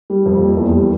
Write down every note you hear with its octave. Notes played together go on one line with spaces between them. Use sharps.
G3
F2
A#3
E2
G3